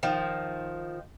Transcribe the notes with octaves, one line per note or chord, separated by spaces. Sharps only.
D#3 F3